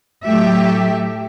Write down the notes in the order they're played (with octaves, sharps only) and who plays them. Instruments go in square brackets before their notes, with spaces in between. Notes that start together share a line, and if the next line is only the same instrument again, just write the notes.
[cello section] A2 F#3 A3 G4 E5